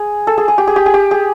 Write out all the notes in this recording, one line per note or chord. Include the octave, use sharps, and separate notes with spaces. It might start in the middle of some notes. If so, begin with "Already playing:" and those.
Already playing: G#4
A4
G#4
G#4
G4
G#4
G4
G#4
G4
G#4